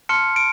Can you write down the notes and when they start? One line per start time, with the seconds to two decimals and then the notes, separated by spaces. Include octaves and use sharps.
0.09 A5 C6 F6 C#7
0.36 D7